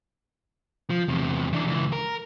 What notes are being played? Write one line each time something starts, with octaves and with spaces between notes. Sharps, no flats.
F3
E2 C3
E3 D4
C#2 E3
A#4